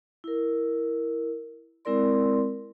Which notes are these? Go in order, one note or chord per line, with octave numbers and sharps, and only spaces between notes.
E4 A#4
G#3 C4 E4 A#4 D5 C6